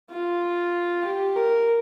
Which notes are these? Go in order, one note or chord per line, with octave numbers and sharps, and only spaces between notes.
F4
G4
A#4